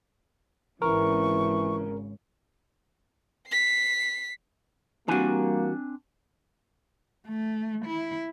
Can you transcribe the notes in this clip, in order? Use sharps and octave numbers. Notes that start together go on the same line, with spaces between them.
G#1 C#3 E3 A#4 C#6
B6 C7
E3 G3 A#3 C4 D4 F#4 G#5
A3
E4